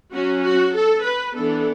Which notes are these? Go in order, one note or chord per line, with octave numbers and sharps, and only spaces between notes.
F#3 C#4 F#4
F#4
A4
B4
E3 B3 D4 A4